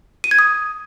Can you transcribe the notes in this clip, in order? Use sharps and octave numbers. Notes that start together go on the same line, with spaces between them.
D#7
G#6
D#6